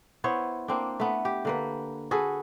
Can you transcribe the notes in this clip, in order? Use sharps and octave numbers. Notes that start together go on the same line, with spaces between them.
B3 E4 C5 C#5
A#3 C4 D4
A3 B3 E5
G4
D3 A#3 B4
F#4 G#4 A4 B4